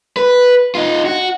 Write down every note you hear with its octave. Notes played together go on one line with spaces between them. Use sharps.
B4
D#4 F4
F#4